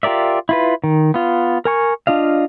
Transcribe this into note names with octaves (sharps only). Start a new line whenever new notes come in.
F4 G4 A#4 D5 E5
E4 F4 B4
D#3
B3 F4
A#4 G#5 C#6
D4 F4 D#5 F5